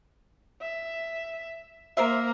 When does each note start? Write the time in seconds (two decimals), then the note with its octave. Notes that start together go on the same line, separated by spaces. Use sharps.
0.61 E5
1.97 A#3 A#4 C5 E5